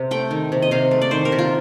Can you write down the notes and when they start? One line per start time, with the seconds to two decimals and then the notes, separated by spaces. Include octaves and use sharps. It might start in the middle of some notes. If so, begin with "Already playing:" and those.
Already playing: C3
0.11 A3 G5
0.31 D#3
0.52 C3
0.62 D#5
0.71 C3 F5
0.91 A3
1.02 D5
1.11 D#3 C5
1.25 A#4
1.32 C3
1.39 F4